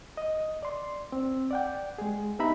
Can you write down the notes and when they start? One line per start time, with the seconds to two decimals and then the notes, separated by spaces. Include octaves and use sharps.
0.17 D#5
0.63 D5 C6
1.12 C4
1.51 D5 F#5 G5
1.98 G#3 G#4
2.39 B3 D#4 G4 E5 A#5 B5